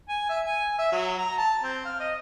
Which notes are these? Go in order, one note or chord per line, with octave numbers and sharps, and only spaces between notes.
G#5
E5
G#5
E5
F#3
A#5
A5
C4
F5
D#5